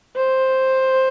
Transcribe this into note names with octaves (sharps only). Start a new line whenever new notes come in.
C5